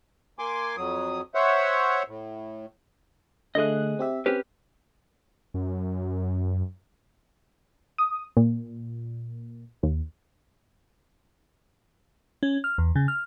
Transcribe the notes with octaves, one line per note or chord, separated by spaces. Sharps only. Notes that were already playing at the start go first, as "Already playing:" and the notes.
A#3 G#5 C6 D6
F2 F#3 D#6
C5 C#5 E5 F#5
A2
D3 A3 G#4 D#5 F#6
C4 G4 E5
C4 C#4 G4 B4 F6
F#2
D#6
A#2
D#2
C#4
F6
E2
C#3
F6